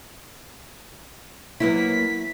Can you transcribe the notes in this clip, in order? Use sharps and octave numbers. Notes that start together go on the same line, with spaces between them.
F#3 A#3 B3 E4 B6